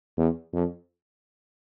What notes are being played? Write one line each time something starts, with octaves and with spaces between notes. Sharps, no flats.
E2
F2